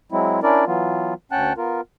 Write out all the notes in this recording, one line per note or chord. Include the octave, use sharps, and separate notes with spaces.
F#3 G#3 C4 E4
C#4 D4 E4 A#4 D5
E3 F#3 B3 F4
D2 C#4 F#5 G5 A5 F#6
B3 F4 A#4